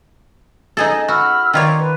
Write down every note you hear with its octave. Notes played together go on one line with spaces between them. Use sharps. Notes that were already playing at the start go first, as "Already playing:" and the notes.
D#4 G#4 A4 D#5
F#4 B5 E6 F6
D#3 F4 C#5 D5
B4